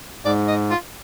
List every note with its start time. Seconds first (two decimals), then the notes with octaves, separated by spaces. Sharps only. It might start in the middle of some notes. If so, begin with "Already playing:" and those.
0.25 G#2 D5
0.48 D#5
0.70 F4